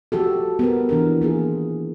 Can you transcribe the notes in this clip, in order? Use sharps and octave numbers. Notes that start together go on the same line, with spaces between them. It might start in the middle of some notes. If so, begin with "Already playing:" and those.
F3 F#4 G4 A4
B3 G4 A#4
E3 D4 A#4
D#3 A#3 F4 G#4